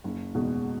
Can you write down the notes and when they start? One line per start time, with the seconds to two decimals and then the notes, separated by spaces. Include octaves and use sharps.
0.04 F#1
0.35 E2 B2 G#3